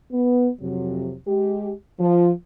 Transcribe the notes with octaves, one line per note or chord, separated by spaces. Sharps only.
B3
F2 C3 F#3
G#3 G4
F3